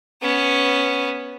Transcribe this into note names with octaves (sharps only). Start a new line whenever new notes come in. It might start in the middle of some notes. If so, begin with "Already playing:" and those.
B3 C#4